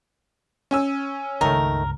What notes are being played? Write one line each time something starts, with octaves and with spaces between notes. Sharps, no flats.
C#4 G#5 E6
C#2 G2 D#3 A3 A#4